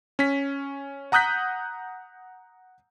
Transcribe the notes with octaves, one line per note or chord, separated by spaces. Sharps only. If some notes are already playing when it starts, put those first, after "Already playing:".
C#4 B6
F#5 A#5 D#6 F#6 G6 B6